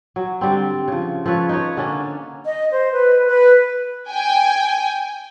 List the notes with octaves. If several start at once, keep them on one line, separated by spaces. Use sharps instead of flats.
F#3
D3 G3 C4
C#3 F3
F3 A4 B4 C#5
D#4 B4 C#5
D3 A#3 C#4 D4
D#5
C5
B4
B4
G5 G#5